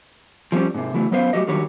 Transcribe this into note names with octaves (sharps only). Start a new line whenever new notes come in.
F3 G3 C4 C#4
G#2 C3
C#3 E3 F#3 A3
F#3 B3 C#4 B4 C5 F5
F#3 A3 F#4 G4 D#5
D3 D#3 F#3 G3 G4 C#5